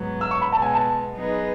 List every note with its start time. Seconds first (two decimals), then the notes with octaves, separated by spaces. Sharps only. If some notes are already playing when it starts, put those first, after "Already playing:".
Already playing: G#2 F#3 B3
0.21 E6
0.31 C#6
0.42 B5
0.52 B2 G#3 B3 A5
0.62 G#5
0.73 A5
1.14 F#3 B3 D#4 G#4 B4